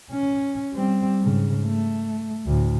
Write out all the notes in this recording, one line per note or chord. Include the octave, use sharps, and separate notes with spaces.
C#4
G3 C4
G#2 C#3
A3
D2 A2